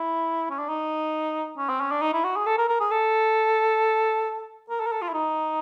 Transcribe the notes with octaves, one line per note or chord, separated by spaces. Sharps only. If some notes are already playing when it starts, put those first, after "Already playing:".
Already playing: E4
C#4
D4
D#4
C#4
C4
C#4
D4
D#4
E4
F#4
G#4
A4
A#4
A#4
G#4
A4
A#4
A4
A#4
A4
F4
E4
D#4